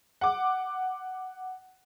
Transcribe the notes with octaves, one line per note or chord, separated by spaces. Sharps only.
F#5 D6